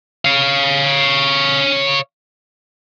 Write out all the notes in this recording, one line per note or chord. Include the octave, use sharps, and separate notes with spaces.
C#5 F5